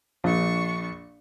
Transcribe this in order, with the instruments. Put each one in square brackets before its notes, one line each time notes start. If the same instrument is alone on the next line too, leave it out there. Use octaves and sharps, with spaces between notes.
[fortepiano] A#1 [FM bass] F3 [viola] D4 C#6